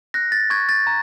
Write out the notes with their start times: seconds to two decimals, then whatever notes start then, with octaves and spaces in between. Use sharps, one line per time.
0.14 F#6 A#6
0.32 A6
0.50 C#6 G#6
0.69 A6
0.87 A#5